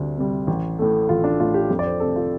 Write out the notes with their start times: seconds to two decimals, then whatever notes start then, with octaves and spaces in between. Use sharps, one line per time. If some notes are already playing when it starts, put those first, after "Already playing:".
Already playing: D2 C3 G3 D4 D5
0.17 C3 G3
0.47 A1
0.79 A2 A3
1.09 A1 F4
1.24 D4
1.40 A2 A3 F4
1.54 G4
1.70 F2 A4
1.79 D5
1.86 C5
2.00 C3 A3 A4
2.16 F4